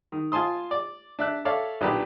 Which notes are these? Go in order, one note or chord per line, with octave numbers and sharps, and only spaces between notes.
D#3
F4 G#5 A5 C6 D#6
D5
D4 E5 F#6
A4 C#5 D5 E5 F5
B1 A#2 D4 G4 B4 B5